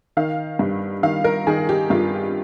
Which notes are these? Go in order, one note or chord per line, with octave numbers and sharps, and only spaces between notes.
D#3 F5
G2
D#3 F5
A#4
D#3 G#4
G4
G2 F4